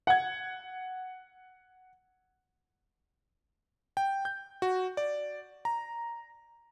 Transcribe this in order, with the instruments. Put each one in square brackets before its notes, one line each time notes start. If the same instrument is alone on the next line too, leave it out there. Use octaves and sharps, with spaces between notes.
[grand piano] F#5 G#6
[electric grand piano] G5
G6
F#4
D5
A#5